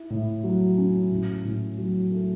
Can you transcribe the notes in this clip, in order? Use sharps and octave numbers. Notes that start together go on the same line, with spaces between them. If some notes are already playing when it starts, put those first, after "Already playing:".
Already playing: E4
A2
F#3
C#4
A2
A2
F#3
A3